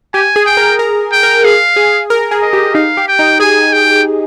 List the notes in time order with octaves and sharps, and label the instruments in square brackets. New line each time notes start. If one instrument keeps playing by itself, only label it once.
[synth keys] G4 [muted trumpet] G#5
[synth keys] G#4
[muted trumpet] G5
[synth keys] A#4
A#4
[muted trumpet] G5
[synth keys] A#4
[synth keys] G#4 [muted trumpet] F5
[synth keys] G#4
A#4
G#4
[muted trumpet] D#5
[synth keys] G4
[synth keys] D#4 [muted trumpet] F5
[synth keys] G4
[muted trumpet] G5
[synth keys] D#4
[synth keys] G#4 [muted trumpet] G#5
[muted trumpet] G5